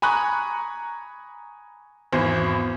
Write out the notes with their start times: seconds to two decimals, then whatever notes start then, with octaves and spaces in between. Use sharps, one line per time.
0.02 G#5 A#5 B5 C#6 D#6 F#6
2.13 G#1 E2 C5